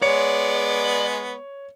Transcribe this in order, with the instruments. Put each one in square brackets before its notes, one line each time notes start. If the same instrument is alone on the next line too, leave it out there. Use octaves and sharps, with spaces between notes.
[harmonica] G#3 B3 [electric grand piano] C#5 C#7 [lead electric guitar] D5